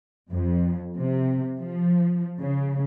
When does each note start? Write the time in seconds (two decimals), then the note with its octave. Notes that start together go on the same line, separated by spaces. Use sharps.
0.30 F2
0.98 C3
1.60 F3
2.40 C#3